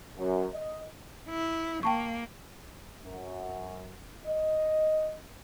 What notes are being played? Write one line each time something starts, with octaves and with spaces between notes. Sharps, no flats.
F#2
D#5
E4
A#3 G5 A5 C#6
F#2
D#5